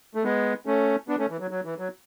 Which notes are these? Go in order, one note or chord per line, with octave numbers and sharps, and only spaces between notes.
A3
G#3 B3
A3 C#4
B3 D4
A3 C#4
E3
F#3
F#3
E3
F#3